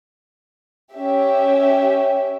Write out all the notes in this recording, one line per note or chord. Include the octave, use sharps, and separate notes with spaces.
C#4 G4 E5